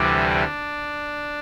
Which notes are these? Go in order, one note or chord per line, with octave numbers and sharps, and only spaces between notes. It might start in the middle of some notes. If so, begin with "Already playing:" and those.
Already playing: D2 C3 E3 G3 D4